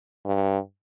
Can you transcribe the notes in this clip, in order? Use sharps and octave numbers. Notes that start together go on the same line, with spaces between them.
G2